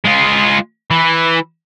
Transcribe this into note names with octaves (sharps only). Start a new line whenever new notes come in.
G#3 F4
E3